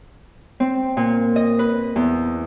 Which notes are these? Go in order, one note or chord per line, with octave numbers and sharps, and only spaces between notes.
C4
A#2
D#5
B4
E2